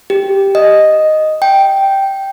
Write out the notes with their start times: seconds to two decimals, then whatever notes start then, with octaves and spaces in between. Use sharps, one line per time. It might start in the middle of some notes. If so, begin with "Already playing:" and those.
0.10 G4
0.55 D#5
1.42 G5